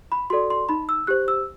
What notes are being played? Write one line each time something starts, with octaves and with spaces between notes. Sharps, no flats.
B5
F#4 A4 D5 C6
C6
D#4 B5
E6
G4 C5 F#6
E6